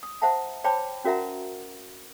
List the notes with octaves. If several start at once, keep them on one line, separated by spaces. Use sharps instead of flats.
D#6
C5 E5 F#5 A5 A#5
C5 C#5 G5 A5 B5 D6
C#4 F#4 A#4 E5 F#5 A#5